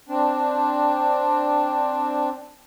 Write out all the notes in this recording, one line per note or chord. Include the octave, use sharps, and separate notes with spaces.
C4 D4